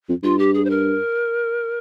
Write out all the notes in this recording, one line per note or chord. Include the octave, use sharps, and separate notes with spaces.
F2
G2 F4
G4
G#4
C5
A#4